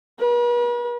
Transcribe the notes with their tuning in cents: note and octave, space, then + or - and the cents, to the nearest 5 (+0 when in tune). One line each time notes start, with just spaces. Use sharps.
B4 -45